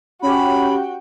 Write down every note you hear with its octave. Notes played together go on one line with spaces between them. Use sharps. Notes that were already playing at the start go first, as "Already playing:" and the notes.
C#4 F#4 G4 G5 B5